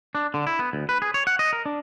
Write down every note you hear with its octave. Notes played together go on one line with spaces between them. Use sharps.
D4
D3
E4
B3
D2
B4
G#4
C#5
F#5
D#5
A#4
D4